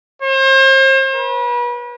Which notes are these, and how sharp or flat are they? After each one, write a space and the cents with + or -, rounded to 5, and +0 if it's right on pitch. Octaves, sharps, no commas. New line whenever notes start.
C5 +40
B4 -35